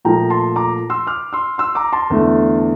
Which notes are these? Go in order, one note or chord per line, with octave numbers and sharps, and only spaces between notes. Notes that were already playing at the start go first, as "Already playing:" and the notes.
A#2 F3 A3 G5 A#5
A5 C6
A#5 D6
C6 E6
D6 F6
C6 E6
C6 E6
A#5 D6
A5 C6
E2 D3 A3